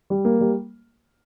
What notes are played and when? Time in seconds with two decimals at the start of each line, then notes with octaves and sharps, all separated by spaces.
0.10 G3
0.25 A#3
0.41 G3